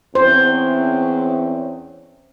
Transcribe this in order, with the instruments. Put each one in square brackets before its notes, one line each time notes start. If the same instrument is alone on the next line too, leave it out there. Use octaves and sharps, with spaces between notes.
[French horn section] E2 C4 C#4 [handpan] C5